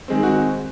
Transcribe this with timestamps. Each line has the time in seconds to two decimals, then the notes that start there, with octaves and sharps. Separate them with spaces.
0.08 D#3 G#3 C4
0.23 F#4